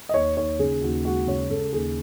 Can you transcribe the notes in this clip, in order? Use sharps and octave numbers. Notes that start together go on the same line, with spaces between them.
D#5
D#2 C#5
D#2 C#5
C#3 G#4
D#2 F#4
G#3 F#4
C#3 C#5
C#3 A4
D#2 G#4